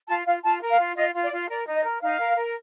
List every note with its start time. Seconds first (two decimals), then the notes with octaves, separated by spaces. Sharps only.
0.08 F4 A5
0.26 F4 F5
0.44 F4 A5
0.61 A#4
0.70 F5
0.79 F4
0.96 F4 D#5
1.14 F4
1.23 D5
1.32 F4
1.49 A#4 D5
1.66 D#4
1.76 D#5
1.84 A#4
2.02 D#4 F5
2.19 A#4
2.37 A#4